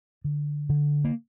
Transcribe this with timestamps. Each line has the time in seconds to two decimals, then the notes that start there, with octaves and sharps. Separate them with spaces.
0.24 D3
0.69 D3
1.04 A#3